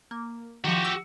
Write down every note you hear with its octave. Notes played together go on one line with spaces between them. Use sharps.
A#3
D#3 F3 F#4 G4
E6